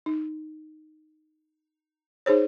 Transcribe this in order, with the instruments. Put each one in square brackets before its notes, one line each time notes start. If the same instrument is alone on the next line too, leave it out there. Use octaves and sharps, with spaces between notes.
[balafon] D#4
D#4 G#4 C5 C#5